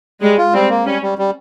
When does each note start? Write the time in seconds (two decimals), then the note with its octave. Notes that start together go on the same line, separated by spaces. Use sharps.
0.21 G3 G#3
0.38 F4
0.54 G3 C4
0.69 A#3
0.86 G3 C#4
1.02 G3
1.18 G3